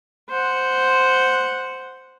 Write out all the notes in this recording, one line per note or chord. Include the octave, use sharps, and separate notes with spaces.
C5 F#5